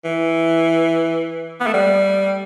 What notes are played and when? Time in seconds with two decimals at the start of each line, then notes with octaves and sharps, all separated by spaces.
0.05 E3
1.60 B3
1.67 A3
1.74 G3